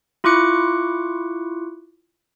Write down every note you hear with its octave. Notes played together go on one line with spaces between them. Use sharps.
E4 F4 C#6 D6 F#6 C#7